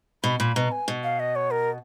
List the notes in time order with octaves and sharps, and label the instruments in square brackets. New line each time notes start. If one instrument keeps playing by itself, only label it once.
[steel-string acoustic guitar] B2 [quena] B5
[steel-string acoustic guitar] A#2 [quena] B5
[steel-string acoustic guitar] B2 [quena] A#5
[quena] G#5
[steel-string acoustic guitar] B2
[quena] F5
D#5
C#5
A#4